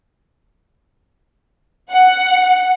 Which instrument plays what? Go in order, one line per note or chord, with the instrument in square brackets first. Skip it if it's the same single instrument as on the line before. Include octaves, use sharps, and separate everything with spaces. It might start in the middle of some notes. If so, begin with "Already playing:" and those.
[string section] F#5